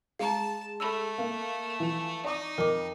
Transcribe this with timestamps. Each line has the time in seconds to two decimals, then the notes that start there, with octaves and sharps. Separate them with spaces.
0.19 G#3 F5 A5 A#5
0.80 A3 A4 B5 E6
1.18 A#3
1.80 E3 F3
2.24 D#4 D5 C#6 D6
2.58 F2 A#4 D#5 D6